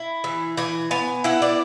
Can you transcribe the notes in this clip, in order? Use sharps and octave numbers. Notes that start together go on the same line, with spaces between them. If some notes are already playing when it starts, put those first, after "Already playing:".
Already playing: E4
E3
E3 G#5
B3 G#5
E4 F#5
D5